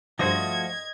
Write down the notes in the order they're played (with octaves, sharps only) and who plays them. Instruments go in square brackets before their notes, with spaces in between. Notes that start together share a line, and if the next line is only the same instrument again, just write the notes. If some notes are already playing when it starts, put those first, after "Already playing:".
[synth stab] G2 C5 A#6 [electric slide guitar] F3 A3 F#4 [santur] D#5 [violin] G#6